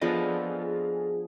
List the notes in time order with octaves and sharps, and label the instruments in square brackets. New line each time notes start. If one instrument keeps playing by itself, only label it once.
[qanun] F3 B3 D4 [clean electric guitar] F4 A4 D#5 [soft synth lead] G#4